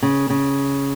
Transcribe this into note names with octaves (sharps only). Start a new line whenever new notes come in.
C#3
C#3